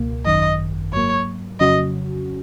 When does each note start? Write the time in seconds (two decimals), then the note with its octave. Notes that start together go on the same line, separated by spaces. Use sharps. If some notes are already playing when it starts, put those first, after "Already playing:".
Already playing: C#2 B2 A#3
0.25 G#1 F#2 D#3 D#5
0.93 G#2 F#3 A#3 C#5
1.60 F2 C#3 F#3 C#4 F#4 D#5